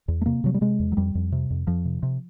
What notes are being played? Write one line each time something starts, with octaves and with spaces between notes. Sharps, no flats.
E2
A3
C3 A#3
C3 F#3
G3
C3 G#3
E2
F#3
F2 G3
F2
C3
F2
F2 F3
C3
C3